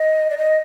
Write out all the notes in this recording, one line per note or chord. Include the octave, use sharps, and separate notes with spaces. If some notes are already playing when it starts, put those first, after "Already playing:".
Already playing: D#5
D5
D#5